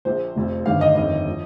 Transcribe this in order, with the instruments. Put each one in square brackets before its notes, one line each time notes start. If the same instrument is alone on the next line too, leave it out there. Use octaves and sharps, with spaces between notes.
[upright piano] A#1 A#2 F3 C5
F1 F2 F3
G1 G2 D#3 F5
D#5
G1 F2 D#3 D#5
F3